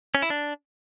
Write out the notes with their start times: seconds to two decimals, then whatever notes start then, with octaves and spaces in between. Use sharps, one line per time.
0.15 C#4
0.22 E4
0.30 D4